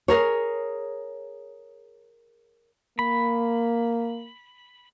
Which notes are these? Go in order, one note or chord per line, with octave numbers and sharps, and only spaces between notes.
G#4 A#4 C#5
A#3 B5